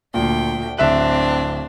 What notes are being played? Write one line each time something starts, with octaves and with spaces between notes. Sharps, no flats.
D2 A#2 G5
D1 C4 D4 E5 F#6